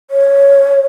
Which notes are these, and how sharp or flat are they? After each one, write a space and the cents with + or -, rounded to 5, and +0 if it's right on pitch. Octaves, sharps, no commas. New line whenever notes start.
C#5 +0